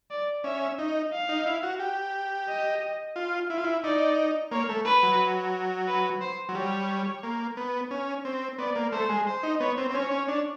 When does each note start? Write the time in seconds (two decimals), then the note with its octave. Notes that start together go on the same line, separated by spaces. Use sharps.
0.11 D5
0.44 C#4 E5
0.78 D#4
1.12 F5
1.29 D#4
1.46 E4
1.63 F#4
1.80 G4
2.48 D#5
3.16 F4
3.50 E4
3.58 F4
3.64 E4
3.84 D#4 D5
4.51 A#3 C#5
4.69 A3
4.85 B4
5.03 F#3
5.88 B4
6.21 C5
6.49 F#3
6.55 G3 C#5
7.23 A#3
7.57 B3
7.91 C#4
8.25 C4
8.58 B3 D5
8.76 A#3
8.92 A3 C5
9.10 G#3
9.27 C5
9.43 D#4
9.60 B3 C#5
9.78 C4
9.91 C4
9.94 C#4 C#5
10.11 C#4
10.28 D4